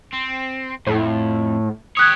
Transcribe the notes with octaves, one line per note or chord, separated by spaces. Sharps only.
C4
F2 A2
G4 C#5 D#6 F#6 G#6